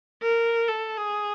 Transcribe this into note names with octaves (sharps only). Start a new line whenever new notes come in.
A#4
A4
G#4